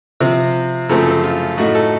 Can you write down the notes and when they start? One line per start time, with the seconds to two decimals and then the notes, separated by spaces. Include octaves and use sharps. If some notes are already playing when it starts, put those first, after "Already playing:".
0.20 C3 F3 C4
0.89 F#2 C#3 F3 A3 C4 A4
1.06 A4
1.24 F4
1.58 A2 A3 D#4 F#4
1.75 A4